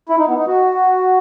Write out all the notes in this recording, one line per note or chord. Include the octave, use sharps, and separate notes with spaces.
E4
D#4
B3
D#4
F#4